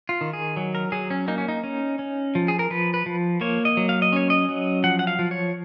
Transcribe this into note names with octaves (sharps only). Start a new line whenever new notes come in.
F4
D#3
G#4
F#3
A#4
F#3 G#4
C#4
A#3 D#4
C#4
D#4
C#4
C#4
F3
G#4
A#4
F3 B4
B4
F3
A#3 C#5
D#5
F#3
F5
D#5
C#4 C#5
D#5
F#3
F3 F#5
F#5
F5
F3
C#5